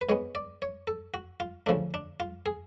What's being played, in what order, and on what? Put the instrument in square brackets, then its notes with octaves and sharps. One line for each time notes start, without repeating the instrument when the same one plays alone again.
[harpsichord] B4
G#2 G#3 B3 C#5
D5
C#5
A4
F#4
F4
D2 C#3 F3 A3 D4
D4
F4
G#4